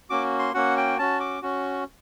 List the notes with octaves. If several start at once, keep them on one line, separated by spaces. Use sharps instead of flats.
A#3 C#4 F#4 D6
C6
A#3 C#4 F#4 F#5
G5
C#4 F#4 A5
D6
C#4 F#4